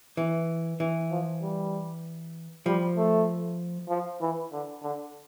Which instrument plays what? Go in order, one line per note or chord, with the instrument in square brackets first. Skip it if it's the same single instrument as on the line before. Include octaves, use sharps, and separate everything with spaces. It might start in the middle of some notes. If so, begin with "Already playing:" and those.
[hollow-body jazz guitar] E3
E3
[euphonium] F3
G3
[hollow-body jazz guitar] F3 [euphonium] G3
[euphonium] A3
F3
E3
D3
D3